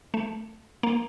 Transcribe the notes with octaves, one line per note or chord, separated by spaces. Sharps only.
A3
A#3